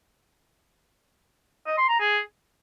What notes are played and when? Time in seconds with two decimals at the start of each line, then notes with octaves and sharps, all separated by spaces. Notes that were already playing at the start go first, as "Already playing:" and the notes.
1.67 D#5
1.78 C6
1.89 A#5
2.00 G#4